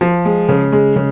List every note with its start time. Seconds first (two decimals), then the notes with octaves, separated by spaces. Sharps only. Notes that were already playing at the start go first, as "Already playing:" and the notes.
0.01 F3
0.25 G#3
0.49 C#3
0.72 G#3
0.96 C#3